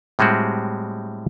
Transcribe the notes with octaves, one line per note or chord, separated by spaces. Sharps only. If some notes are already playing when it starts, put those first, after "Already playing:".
A2 G3 G#3 C4 F#4 G4